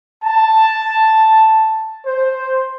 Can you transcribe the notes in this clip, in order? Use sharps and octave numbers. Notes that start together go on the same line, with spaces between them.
A5
C5